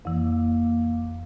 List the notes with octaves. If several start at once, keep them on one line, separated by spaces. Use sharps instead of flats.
F2 E3 A#3